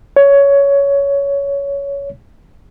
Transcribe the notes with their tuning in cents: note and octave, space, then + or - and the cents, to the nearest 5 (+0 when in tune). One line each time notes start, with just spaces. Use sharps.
C#5 +15